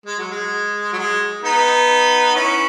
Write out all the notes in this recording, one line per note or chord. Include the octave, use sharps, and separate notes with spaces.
G#3
F#3
G#3
F#3
G#3
B3 D#4
C#4 E4